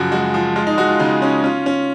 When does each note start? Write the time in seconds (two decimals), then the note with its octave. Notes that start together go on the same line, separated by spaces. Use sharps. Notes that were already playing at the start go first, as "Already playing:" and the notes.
Already playing: F#2 C#3 F3 F#4
0.12 G#3 F#4
0.34 F3
0.56 G#3 F4
0.67 D#4
0.78 G#3 F#4
0.89 F4
0.99 C#3 D#4
1.22 C#4
1.44 C#4 F4
1.66 C#4